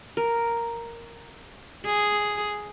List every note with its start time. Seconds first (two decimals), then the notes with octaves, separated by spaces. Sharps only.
0.17 A#4
1.85 G#4